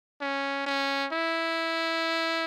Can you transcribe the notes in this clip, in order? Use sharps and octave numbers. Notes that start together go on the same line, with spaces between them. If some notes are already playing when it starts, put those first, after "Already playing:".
C#4
C#4
E4